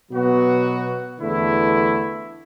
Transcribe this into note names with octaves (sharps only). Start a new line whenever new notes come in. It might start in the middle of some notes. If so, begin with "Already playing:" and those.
B2 F#3 B3 F#4
E2 D3 A3 E4